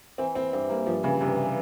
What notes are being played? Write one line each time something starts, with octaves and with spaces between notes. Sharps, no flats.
E3 C4
E3 C4
G2 C4
G2 A#3
G2 F3
C#3 E3
G2 C3
E3